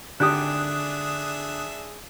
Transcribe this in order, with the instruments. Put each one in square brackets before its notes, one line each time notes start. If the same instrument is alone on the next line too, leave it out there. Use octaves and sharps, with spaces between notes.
[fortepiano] G#1 G4 [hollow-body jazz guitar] D3 [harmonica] D4 G#4 E5 [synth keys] D#6 F#6